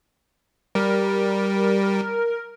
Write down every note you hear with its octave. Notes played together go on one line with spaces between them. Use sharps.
G3 A#4